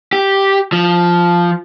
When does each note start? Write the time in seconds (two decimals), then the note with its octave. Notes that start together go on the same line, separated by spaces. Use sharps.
0.13 G4
0.72 F3